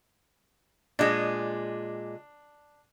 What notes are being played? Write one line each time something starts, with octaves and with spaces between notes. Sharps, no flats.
A#2 G#3 D4